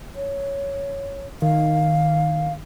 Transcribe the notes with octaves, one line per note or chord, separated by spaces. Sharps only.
C#5
D#3 F5